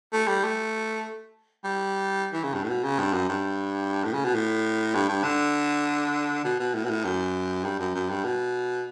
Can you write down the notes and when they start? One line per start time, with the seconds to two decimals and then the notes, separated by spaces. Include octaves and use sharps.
0.13 A3
0.28 G3
0.44 A3
1.64 G3
2.33 E3
2.44 C#3
2.54 G2
2.64 A2
2.70 B2
2.84 C#3
3.00 G2
3.13 F#2
3.29 G2
4.05 A2
4.14 C#3
4.25 B2
4.35 A2
4.95 G2
5.09 G2
5.24 D3
6.44 B2
6.60 B2
6.74 A2
6.85 B2
6.90 A2
7.05 F#2
7.64 G2
7.79 F#2
7.95 F#2
8.10 G2
8.24 B2